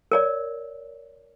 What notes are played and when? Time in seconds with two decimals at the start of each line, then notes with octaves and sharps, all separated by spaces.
0.12 A#4 C#5 D5